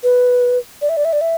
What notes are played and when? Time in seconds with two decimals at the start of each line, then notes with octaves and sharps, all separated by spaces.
0.03 B4
0.82 D5
0.89 E5
0.97 D5
1.05 E5
1.13 D5
1.21 E5